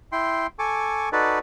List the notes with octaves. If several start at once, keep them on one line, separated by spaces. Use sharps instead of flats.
E4 G5 C6
A4 G#5 C#6 D6
D#4 F#4 A4 B4 D5